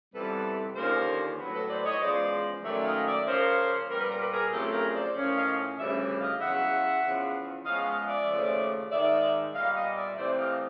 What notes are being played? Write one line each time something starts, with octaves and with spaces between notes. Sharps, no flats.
F2 C3 E3 G3 B3 A4 B4
D#2 D3 F3 A#3 C#4 A#4 C5
A2 F#3 B3
A4 B4
C5 D5
C#5 D#5
E2 C#3 F3 G#3 C5 D5
G#2 D#3 F#3 A3 C#4 D5 E5
D#5 F5
D5 E5
C#3 F3 A#3 C#4 A#4 C5
A#2 G3 B3 A#4
B4
A#4
B4
G#4 A#4
F2 C#3 F#3 A3 C4 G4 A4
G#4 A#4
C5 D5
A2 F3 A#3 C#4
D#5 F5
D2 C#3 E3 G3 D5 E5
D#5 F5
E2 C#3 F#3 E5 F#5
E2 C#3 F3
C#3 F3 G#3 B3 D#5 F5
D#5 F5
D5 E5
D#2 C#3 F3 A3 C#4
G#2 D#3 G#3 D5 E5
A#2 G3 B3 D#5 F5
D#5 F5
D5 E5
C3 E3 A3 C4 C5 D5
D#5 F5